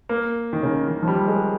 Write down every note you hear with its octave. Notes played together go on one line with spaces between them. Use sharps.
A#3
D#3
C#3
D#3
F3
G3
G#3